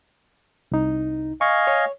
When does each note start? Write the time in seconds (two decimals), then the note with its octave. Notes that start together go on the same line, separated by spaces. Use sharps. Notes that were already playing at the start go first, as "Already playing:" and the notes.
0.72 C2 D#4
1.41 D#5 F5 G#5 C#6
1.67 C#5